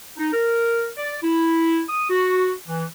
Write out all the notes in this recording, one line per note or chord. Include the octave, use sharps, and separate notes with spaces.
D#4
A#4
D5
E4
D#6
F#4
E3